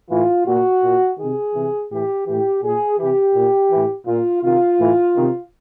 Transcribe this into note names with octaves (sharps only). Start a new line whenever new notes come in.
A2 E3 F4
A#2 F#4
A#2
C3 D#3 G#4
C3 E3
A2 E3 G4
A2 E3 G4
A#2 G#4
C3 E3 G4
A#2
A2 E3
A#2 F4
C3 D#3 F4
A2 E3
C3 D#3